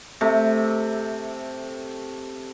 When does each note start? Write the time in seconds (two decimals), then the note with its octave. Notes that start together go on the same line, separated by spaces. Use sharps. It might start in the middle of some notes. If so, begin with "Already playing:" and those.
0.21 C3 A3